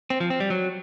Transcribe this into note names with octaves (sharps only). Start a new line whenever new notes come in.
C4
F3
C4
G3
F#3